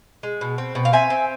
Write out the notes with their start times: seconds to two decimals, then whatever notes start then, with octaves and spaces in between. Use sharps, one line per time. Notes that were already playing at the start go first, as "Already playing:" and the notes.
0.23 G#3
0.41 B2
0.58 C4
0.75 B2
0.85 F5
0.93 C4 E5 G#5
1.10 C4